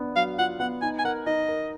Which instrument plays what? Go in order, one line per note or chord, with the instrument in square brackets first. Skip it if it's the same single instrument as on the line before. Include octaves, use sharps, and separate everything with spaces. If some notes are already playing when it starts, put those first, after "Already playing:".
Already playing: [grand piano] B3 D4
[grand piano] F#3 [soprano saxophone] F5
[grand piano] F4 [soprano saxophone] F#5
[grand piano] B3 [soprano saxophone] F#5
[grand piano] D#4 [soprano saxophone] G#5
[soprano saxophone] G#5
[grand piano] A#4 [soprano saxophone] F#5
[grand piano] D#4 [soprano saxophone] D#5
[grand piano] A#4